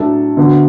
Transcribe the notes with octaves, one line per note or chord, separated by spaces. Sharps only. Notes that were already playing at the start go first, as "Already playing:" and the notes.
Already playing: A2 F#3 D4 A4
D3 B3 F#4